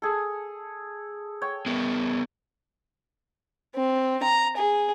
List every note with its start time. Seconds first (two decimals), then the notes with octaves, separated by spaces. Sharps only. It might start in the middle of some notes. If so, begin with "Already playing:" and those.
0.02 G#4 A4
1.42 C#5 G5
1.66 B3 G#4 A#4
3.75 C4
4.23 A#5
4.57 G#4